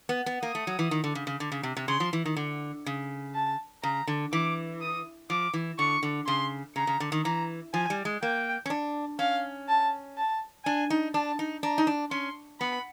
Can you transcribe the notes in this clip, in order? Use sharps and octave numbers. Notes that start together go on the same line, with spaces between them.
B3
B3
A#3 D#6
A3
F#3
E3
D#3
D3
C#3
C#3
D3
C#3
C3
C3
C#3 C6
F3
E3
D#3
D3
C#3
A5
C#3 A#5
D3
E3 D6
D#6
F3 D6
E3
D3 C#6
D3
C#3 C6
C#3 A#5
C#3
D3
D#3
E3 A#5
F3 G#5
G3
G#3
A#3 G5
C#4
D4
C#4 F5
A5
A5
D4 G#5
D#4
D4 A5
D#4
D4 A#5
D#4
D4
C#4 C6
B3 B5